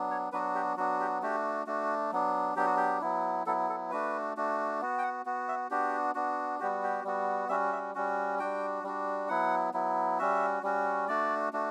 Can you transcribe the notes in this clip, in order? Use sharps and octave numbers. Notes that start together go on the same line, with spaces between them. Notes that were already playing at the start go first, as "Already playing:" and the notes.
Already playing: F#3 B3 D4
C#5
F#3 B3 D4 F#4 B4
G4
F#3 B3 D4 F#4
G4
A3 D4 F#4 G4
A3 D4 F#4
F#3 B3 D4
F#3 B3 D4 G4
F#4
G4
F#3 B3 E4
F#3 B3 E4 A4
A4
A3 D4 F#4 B4
A3 D4 F#4
B3 F#4
G5
F#5
B3 F#4
E5
B3 D4 F#4 G4
B3 D4 F#4
G3 B3 F#4 G4
G4
G3 B3 F#4
G3 C#4 F#4 E5
E5
G3 C#4 F#4
G3 D4 F#4 G5
G3 D4 F#4
F#3 B3 E4 F#5
F#3 B3 E4
G3 C#4 F#4 E5
G3 C#4 F#4
A3 D4 F#4 D5
A3 D4 F#4